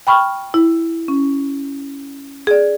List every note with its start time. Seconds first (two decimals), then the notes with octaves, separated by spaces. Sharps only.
0.07 G5 B5 C#6 F6
0.54 E4
1.08 C#4
2.47 G#4 D5